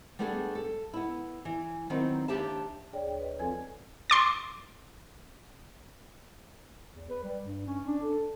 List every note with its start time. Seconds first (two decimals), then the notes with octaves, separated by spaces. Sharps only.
0.19 G3 A3 B3 D4 G4 G#4
0.55 A4
0.94 B3 E4
1.45 E3
1.90 D#3 F#3 B3 C4 D#4 E4
2.28 D#2 F#3 D4 G4 E5 A5
2.93 D2 G#4 C#5 D5 G5
3.07 G5
3.20 B4 D#5
3.39 F2 F3 C4 A4 G#5 G#6
4.10 C6 D6 A6
6.95 E2
7.10 B4
7.24 G3
7.43 G2
7.67 C#4
7.87 D4
8.03 A4